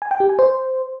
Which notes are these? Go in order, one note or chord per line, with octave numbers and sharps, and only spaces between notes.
G#5
G5
G4
G#5
C5